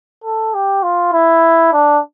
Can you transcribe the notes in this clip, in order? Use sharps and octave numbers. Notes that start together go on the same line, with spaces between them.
A4
G4
F4
E4
D4